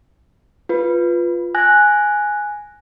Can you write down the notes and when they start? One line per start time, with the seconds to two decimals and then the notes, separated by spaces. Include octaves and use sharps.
0.69 F4 B4
1.55 G#5 F#6 A#6